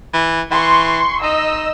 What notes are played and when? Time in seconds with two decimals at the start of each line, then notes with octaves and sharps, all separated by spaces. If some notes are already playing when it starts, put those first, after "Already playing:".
0.13 E3
0.51 E3 C6 C#6
1.23 D#4 D#5 E6